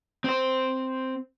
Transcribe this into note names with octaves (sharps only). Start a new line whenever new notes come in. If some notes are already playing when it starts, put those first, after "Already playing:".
C4 C5